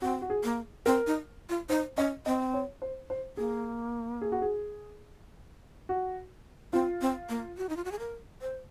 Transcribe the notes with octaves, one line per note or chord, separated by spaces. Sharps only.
C4 F#4
F#4
G#4
A#3
C4 A#4
D#4
F4
D#4 C5
C#4 D#5
C4 D#5
C#5
C5
C5
A#3 G#4
G#4
F#4
G#4
F#4
C4 F4
C4
A#3
F#4
D#4
F4
F#4
G#4
A#4
C5